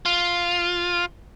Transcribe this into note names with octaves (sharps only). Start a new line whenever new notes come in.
F4